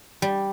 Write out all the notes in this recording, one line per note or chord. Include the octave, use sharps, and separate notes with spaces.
G3